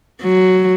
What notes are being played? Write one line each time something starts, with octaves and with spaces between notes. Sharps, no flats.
F#3